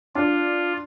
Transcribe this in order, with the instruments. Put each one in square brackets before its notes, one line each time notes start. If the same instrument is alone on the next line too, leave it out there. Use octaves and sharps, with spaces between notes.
[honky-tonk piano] D4 [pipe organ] F4